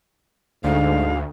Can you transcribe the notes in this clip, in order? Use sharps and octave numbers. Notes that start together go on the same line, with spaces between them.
D2 G#2 D3 F5